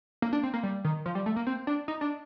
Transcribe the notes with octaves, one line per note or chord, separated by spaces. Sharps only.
A#3
D4
C4
A#3
G3
D#3
F3
G3
A3
A#3
C4
D4
D#4
D4